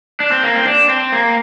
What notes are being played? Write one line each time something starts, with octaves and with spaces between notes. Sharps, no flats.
D4
C4
A#3
C4
D4
C4
A#3